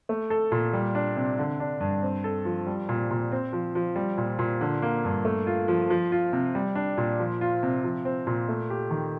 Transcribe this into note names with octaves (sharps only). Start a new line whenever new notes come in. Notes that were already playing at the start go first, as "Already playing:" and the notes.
A3
A4
A#2
G3
D4
C3
D3
D4
G2
C4
A4
F3
G3
A#2
A#2
C4
F3
F3
G3
A#2
A#2
D3
A#3
G2
A3
F4
F3
F3
F4
C3
G3
D4
A#2
F3
F4
C3
F3
C4
A#2
A3
G4
D#3